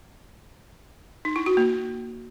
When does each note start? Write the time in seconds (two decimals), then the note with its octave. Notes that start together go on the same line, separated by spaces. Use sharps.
1.25 D#4
1.36 E4
1.46 F#4
1.57 A#3